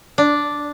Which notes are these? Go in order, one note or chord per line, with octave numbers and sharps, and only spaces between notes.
D4